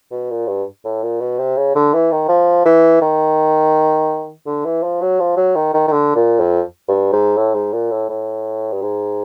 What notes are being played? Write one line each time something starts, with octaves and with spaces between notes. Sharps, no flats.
B2
A#2
G2
A2
A#2
B2
C3
C#3
D3
E3
D#3
F3
E3
D#3
D3
E3
F3
F#3
F3
F#3
D#3
D#3
D#3
D3
A#2
F2
G2
G#2
A2
G#2
A#2
A2
A2
G2
G#2